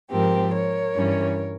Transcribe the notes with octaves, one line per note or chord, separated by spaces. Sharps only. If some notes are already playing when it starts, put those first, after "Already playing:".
G#2 F3 C4 G4 A#4
A#4 C#5
G2 E3 G3 C#4